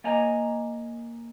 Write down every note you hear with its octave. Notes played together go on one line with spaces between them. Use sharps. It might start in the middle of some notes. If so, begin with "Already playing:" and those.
A#3 C#5 D#5 G#5 A#5